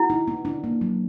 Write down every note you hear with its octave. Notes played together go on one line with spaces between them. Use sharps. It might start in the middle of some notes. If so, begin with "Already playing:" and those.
Already playing: E4 F#4
D#4
B3
D4
A#3
F#3